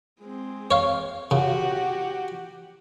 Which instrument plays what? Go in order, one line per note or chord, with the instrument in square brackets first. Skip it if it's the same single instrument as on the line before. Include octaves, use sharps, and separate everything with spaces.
[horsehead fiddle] G#3 C4
[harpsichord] C#5 F5
[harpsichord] C#3 [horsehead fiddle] F#4 G4